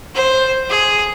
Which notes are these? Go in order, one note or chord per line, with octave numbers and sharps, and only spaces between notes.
C5
G#4